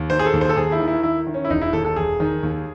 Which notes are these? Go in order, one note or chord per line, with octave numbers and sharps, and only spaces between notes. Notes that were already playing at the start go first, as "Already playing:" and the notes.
Already playing: D#2
D#3 C5
G#4
A4
D#2
C5
A4
D#2 G#4
E4
D#3
E4
D#3 E4
D#3
C#4
E4
E1 D#4
E4
D#2 A4
A4
E1 G#4
D#3
D#2